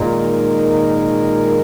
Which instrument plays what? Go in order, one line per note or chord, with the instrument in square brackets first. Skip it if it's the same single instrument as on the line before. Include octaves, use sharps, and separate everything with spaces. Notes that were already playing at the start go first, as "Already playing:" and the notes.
Already playing: [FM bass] A#2 [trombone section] D#3 G#3 D#4 A#4